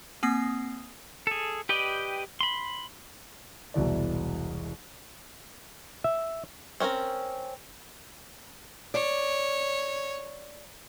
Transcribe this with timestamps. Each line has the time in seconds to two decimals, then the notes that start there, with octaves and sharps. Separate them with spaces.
0.23 A#3 C4 D#6 A#6 C7
1.27 G#4 A4
1.69 G4 B4 D5 D#5 G5
2.41 B5 C6
3.74 E1 C2 B2 E3 D5
6.04 E5
6.80 C4 C#4 D#4 A#4
8.94 C#5 D5